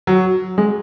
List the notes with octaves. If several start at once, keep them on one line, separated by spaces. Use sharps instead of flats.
F#3
G#3